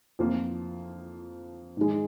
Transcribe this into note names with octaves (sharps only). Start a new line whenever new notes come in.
F2 F3 A#3 F4
G#2 D#3 G#3